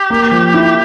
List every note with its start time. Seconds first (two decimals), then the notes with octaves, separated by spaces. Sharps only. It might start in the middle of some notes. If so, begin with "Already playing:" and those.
Already playing: G4
0.10 A#3
0.31 F3
0.54 E4